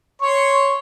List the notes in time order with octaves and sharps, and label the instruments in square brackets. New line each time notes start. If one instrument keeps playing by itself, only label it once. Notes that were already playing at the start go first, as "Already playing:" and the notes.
[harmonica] C#5 C6 C#6